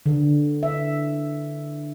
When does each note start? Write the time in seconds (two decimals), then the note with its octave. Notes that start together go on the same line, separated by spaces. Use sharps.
0.06 D3
0.63 E5